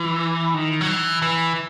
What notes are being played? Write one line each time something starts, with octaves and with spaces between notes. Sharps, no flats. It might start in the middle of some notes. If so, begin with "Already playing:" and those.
Already playing: E3
D#3
F#3
E3
E3